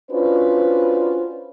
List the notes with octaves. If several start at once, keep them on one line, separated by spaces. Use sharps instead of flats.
C#4 D4 F4 F#4 B4 C5